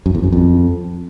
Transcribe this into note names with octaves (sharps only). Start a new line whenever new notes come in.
F#2
E2
F#2
F2